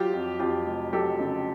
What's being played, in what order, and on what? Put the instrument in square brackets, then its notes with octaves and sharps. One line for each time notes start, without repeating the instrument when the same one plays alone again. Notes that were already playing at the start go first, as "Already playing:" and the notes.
Already playing: [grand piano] F#3 F4 G4
F2
F2 F4 G4
F1
F#3 G4 A4
C#3